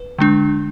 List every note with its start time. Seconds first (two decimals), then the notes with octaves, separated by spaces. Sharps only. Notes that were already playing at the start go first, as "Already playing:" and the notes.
Already playing: B4
0.18 D3 G#3 D4